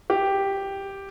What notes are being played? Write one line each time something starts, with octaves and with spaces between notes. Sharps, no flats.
G4